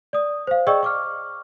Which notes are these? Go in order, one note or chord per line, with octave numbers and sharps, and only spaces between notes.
D5 D#6
C5 F5
G#4 D5 D#5 G5 C#6 E6
C#6 D6 F6